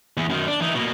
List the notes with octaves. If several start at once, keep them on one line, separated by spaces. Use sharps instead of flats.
E2
F#2 D#3
D4
E3 D#4
B2 A#3